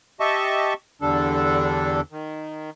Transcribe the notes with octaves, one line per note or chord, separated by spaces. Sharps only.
G4 D#5 E5 A5 C#6
E2 D3 G3 D4 A4
D#3